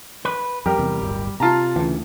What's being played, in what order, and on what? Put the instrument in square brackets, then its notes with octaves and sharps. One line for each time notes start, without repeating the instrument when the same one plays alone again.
[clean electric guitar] B4
[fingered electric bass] F2 [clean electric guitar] G3 [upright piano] G4 A#4
[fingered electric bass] E2 C3
D1 G1
[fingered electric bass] C3 [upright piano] F4 A5 A#5
[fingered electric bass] D2 [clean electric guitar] C#3 E3